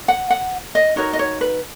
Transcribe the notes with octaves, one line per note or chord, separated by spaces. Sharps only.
F#5
F#5
D#5
D#4 F#4 A#4 C#5
D#5
C#5
B4